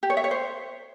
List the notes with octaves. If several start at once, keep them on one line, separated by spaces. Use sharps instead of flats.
G4
C#5
E5
C#5
C5